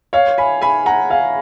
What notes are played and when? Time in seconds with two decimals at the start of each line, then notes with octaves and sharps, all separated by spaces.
0.13 C#5 F5
0.38 G#5 B5
0.62 G#5 B5
0.86 F#5 A#5
1.10 F5 G#5